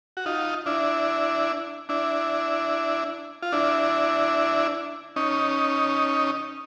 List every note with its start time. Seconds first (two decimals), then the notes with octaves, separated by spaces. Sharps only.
0.17 F#4
0.26 D#4 F4
0.66 D4 E4
1.89 D4 E4
3.42 F4
3.52 D4 E4
5.16 C#4 D#4